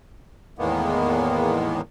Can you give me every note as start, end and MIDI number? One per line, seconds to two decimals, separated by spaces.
0.59 1.81 40
0.59 1.81 45
0.59 1.81 51
0.59 1.81 56
0.59 1.81 58
0.59 1.81 59